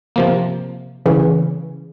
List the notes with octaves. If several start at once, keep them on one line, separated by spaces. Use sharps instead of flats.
C3 F3 A#3
C#3 E3